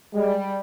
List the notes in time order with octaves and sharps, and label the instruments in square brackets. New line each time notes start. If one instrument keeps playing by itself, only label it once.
[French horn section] G3 [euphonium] G#3